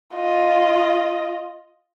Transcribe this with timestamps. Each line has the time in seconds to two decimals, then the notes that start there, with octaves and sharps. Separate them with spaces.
0.14 F4 D#5